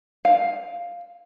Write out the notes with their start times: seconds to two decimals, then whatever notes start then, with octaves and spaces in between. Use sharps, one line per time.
0.25 F5